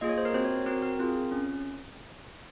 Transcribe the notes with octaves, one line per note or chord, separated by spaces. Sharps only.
A#3 F4 G#4 D#5
C#5
C5
A#4
C4 F#4 C5
C#5
C5
C4 F#4 A#4
A#4
C4 F4 G#4
C#4